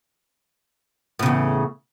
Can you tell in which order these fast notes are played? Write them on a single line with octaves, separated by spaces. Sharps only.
A2 C#3 E2